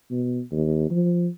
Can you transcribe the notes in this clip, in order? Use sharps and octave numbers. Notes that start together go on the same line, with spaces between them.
B2
D#2
F3